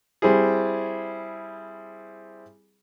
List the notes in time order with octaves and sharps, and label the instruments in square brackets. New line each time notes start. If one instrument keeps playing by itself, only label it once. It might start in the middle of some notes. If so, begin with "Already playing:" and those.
[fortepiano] G3 C4 E4 G#4